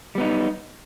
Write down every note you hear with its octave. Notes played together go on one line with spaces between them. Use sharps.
G3 B3 D#4